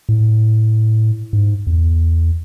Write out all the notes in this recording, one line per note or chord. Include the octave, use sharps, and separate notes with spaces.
A2
G#2
E2